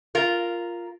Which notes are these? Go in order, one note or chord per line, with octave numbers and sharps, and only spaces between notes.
F4 A#4